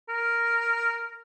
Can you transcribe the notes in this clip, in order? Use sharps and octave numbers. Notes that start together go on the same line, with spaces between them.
A#4